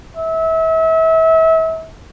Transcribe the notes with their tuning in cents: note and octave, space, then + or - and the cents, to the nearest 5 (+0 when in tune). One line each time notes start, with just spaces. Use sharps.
E5 -35